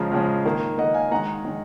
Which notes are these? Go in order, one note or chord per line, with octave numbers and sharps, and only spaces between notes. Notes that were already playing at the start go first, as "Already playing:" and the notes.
Already playing: C#3 F3 G#3 A#5
C#3 F3 G#3
D#3 A#3
D#3 A#3 D#5 F#5
F5 G#5
D#3 G#3 F#5 A#5
D#3 G#3